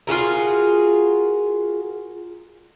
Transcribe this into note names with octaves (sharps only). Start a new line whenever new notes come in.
F4 F#4 G#4 A#4